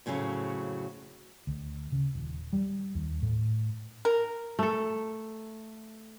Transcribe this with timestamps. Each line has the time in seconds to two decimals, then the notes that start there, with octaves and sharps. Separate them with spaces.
0.06 F2 A2 C#3 F#3 A3
1.47 D2
1.92 C#3
2.15 D#1
2.53 G3
2.95 D#2
3.22 A2
4.05 A#4
4.59 A3 A4